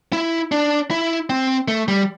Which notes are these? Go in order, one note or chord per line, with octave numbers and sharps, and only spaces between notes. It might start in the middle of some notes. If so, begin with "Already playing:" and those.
E4
D4
E4
C4
A3
G3